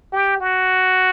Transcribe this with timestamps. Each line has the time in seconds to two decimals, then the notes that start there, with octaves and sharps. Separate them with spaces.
0.13 G4
0.40 F#4